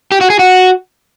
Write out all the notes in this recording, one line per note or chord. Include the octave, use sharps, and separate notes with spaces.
G4
F#4
G#4
F#4